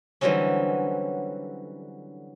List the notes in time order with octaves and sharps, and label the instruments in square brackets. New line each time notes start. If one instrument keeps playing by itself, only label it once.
[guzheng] D3 E3 F#3 G3 C4 C#4